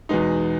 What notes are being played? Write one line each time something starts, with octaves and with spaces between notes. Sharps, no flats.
E2 B2 G#3 B3 D#4